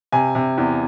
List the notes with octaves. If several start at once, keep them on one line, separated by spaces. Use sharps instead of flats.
C3 G#5
C3
E2